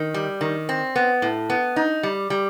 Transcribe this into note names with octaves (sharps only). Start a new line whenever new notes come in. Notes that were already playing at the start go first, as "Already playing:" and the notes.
Already playing: D#3
G3
D#3
C4
B3
A2
B3
D#4
G3
G3